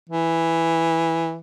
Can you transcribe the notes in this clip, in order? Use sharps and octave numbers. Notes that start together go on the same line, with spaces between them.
E3